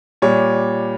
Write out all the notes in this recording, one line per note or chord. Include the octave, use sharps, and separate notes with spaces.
A#2 G3 C#5